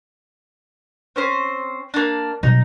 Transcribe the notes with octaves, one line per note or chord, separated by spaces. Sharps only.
C4 C#4 C5
A#3 D4
B2 F#3 G3 D#4